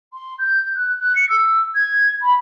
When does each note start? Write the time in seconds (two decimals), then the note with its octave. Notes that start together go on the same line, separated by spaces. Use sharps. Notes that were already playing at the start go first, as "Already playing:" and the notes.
0.13 C6
0.38 G6
0.75 F#6
0.99 F#6
1.15 C#7
1.29 E6
1.75 G#6
2.22 B5